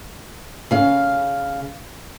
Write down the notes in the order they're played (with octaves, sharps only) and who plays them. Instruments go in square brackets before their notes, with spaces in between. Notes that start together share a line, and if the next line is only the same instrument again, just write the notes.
[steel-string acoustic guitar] C#3 F5